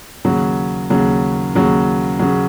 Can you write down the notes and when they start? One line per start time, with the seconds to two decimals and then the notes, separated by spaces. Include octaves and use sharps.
0.25 D#2 C#3 F#3
0.90 D#2 C#3 F#3
1.55 D#2 C#3 F#3
2.19 C#3 F#3